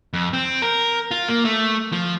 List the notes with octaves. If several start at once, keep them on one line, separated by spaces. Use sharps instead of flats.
F2
C4
A#4
F4
A#3
A3
F3